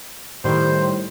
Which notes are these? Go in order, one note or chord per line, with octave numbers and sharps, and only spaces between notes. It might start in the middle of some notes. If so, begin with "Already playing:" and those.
A2 D#3 G3 C5